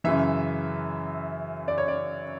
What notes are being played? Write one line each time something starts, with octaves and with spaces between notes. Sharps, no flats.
F#2 C#3 E3 E5
D5
C#5
D5